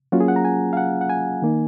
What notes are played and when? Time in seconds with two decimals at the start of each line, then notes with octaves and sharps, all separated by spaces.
0.12 F#3 A#3 C#4 F4 F#4
0.20 G#4
0.28 F#5
0.36 A#5
0.45 G#5
0.73 F5
0.77 F#5
1.01 F#5
1.10 G#5
1.42 D#3 A#3 D#4